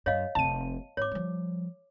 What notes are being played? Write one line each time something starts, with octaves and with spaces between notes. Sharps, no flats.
F#2 C#5 D#5 F5
F1 C3 A5 D#7
G#1 C#5 D6
F3 G3